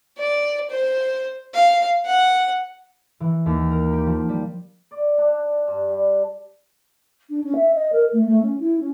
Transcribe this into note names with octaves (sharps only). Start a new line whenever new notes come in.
D5
C5
F5
F#5
E3
D#2
A#4
G4
F3
G3
D5
D4
G2
G3
D4
C#4
E5
D#5
A#4
A3
A3
C#4
E4
C#4